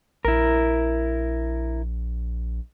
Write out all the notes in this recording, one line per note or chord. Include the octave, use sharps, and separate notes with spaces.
A#1 E4 A#4